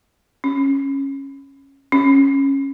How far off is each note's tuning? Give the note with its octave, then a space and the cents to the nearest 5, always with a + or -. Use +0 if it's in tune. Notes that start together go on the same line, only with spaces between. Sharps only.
C#4 -10
C#4 -10